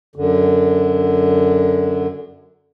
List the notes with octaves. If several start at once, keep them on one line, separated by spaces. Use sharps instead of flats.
F#2 D3